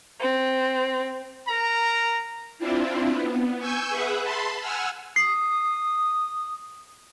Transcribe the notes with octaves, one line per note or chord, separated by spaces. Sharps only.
C4
A#4 A#5
C4 D4 E4 F4
B3
G#5 C#6 E6 G6
G#4 B4 E5 F#5
A5 B5 C6
F#5 G#5 E6 F6
D#6 C7